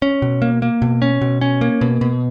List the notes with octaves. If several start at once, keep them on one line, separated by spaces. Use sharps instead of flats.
C#4
B2
A#3
A#3
B2
C#4
B2
C#4
A#3
B2
B2